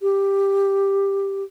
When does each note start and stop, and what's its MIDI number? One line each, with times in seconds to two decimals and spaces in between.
0.01 1.43 67